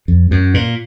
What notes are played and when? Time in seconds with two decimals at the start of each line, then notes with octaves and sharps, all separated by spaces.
0.08 F2
0.31 F#2
0.54 A#2